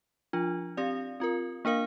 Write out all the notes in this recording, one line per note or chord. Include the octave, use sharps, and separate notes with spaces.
F3 D4 F4
C4 G4 D5 F5
C4 F4 A#4
A#3 D4 A#4 F5